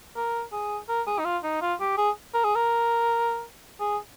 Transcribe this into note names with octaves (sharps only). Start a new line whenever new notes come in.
A#4
G#4
A#4
G#4
D#4
F4
D#4
F4
G4
G#4
A#4
G#4
A#4
G#4